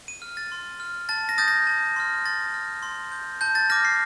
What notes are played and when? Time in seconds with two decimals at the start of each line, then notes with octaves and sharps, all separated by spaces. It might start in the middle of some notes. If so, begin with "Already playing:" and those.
0.08 D#7
0.22 F6
0.37 A6
0.52 C6
0.80 F6
1.09 A5 A6
1.29 A#6
1.38 D#6 G6 A6
1.48 A#6
1.67 A5
1.96 C6 F6
2.25 C6 A6
2.54 F6
2.82 C6
3.12 G6
3.41 A5 G6
3.55 A6
3.70 D6 F6 A#6
3.85 C7